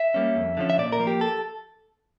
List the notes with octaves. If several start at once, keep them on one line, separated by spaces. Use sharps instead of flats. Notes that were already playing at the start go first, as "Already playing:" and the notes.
Already playing: E5
G3 A#3 C#4
F2
D3 F3 C#4
E5
A#2 D5
A#4
F3 A#3
G4
A4